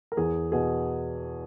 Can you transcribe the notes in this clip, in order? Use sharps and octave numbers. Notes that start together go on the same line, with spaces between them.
A#4
E2 G#4
B2 G#4